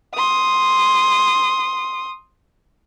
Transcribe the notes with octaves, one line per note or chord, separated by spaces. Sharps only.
C6 D#6